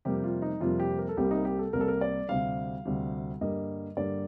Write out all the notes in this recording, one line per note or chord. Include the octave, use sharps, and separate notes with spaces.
F2 C3 G3 A#3 G4
F4
D#4
F2 C3 G3 A#3 F4
G4
A#4
A4
C2 C3 G3 A#3 G4
D#4
G4
A4
C2 C3 G3 A#3 A#4
A4
A#4
D5
D2 C3 G3 F5
D2 C3 G3
G2 D3 G3 A#3 D#5
G2 D3 G3 A#3 D5